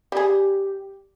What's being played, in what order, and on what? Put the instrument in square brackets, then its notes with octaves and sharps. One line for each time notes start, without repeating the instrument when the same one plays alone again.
[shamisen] G3 G#4 [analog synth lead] G4